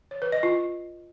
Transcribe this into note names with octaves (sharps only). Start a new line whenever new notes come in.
C#5
B4
D#5
F4